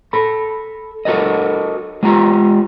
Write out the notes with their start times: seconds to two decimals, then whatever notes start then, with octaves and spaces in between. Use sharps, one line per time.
0.13 A4 B5
1.05 F#4 A4 A#4 D#5
2.03 G#3 F4 G4 A#5